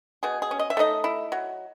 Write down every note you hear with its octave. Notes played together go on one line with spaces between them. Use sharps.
B2 G#4
G#4
C#4
D#5
E5
A3 D#4 D#5
E4
F#3